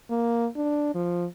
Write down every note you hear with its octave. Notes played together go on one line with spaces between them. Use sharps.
A#3
D4
F3